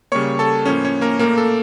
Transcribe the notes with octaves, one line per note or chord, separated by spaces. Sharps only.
C#3 G3 A#3 C#5 C#6
A4 A5
A2 F3 A#3 C#4 C#5
C#4 C#5
A#3 A#4
A#2 A3 A#3 A#4
A4